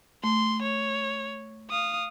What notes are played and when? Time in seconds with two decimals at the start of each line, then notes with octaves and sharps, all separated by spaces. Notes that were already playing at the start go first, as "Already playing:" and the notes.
0.24 A3 C6
0.62 C#5
1.70 F5 D#6